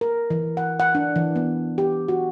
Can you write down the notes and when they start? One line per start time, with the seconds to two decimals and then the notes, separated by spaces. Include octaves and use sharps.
0.01 A#4
0.30 E3
0.57 F#5
0.80 F#5
0.95 D4
1.16 E3
1.36 B3
1.78 G4
2.08 F#4